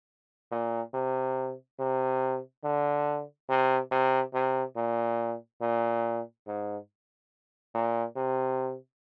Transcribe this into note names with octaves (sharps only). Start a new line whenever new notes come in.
A#2
C3
C3
D3
C3
C3
C3
A#2
A#2
G#2
A#2
C3